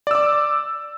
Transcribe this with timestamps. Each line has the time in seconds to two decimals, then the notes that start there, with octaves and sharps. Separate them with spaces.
0.07 D5
0.11 E6
0.15 D6